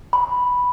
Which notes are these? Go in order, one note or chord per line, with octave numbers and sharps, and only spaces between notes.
B5